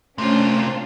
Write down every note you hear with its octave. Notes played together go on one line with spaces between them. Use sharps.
C3 A3 A#3 C#4 D4 F4 C5